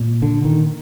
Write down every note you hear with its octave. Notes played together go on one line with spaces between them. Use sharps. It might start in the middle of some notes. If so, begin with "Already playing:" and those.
Already playing: A#2
D3
D#3